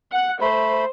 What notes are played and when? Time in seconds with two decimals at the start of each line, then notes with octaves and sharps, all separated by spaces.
0.12 F#5
0.41 A3 C5 B5